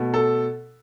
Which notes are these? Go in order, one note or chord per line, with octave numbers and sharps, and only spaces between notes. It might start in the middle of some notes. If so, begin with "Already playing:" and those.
Already playing: B2 A3
A4